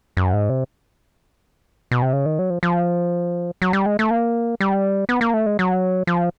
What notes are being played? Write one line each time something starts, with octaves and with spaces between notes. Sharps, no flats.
F#2
G#2
C3
B2
C3
C#3
D#3
F#3
F3
F3
F#3
G3
G#3
A3
A#3
G3
B3
A#3
A3
G#3
F#3
F3